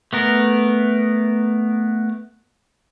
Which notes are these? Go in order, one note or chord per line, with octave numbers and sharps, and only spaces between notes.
A3 B3 A#4